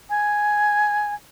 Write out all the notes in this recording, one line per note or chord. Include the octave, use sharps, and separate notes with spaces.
G#5